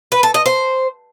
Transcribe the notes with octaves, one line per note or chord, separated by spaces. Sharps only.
B4
A4
D#5
C5